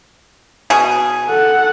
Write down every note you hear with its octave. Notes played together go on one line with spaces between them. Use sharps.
B2 G#4
A4 F#5